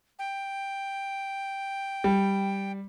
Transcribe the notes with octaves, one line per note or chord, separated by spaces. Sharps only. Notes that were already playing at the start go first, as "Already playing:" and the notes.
G5
G3